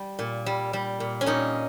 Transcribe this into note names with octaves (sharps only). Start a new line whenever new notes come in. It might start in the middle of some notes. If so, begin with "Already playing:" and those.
Already playing: G3
A#2
G3
G3
A#2
C#4
A#2 D#4